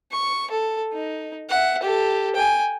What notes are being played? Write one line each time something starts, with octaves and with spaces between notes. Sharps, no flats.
C#6
A4
D#4
E5 F#5
G4 A4
G5 G#5